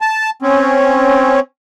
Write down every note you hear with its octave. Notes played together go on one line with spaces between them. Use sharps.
A5
C4 C#4